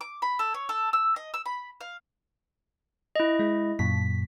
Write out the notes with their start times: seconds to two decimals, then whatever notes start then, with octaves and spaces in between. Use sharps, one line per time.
0.01 D6
0.22 B5
0.39 A4
0.54 C#5
0.69 A4
0.93 E6
1.16 D#5
1.34 E6
1.46 B5
1.81 F5
3.16 E4 D#5
3.39 G#3
3.79 F#2 A#2 B6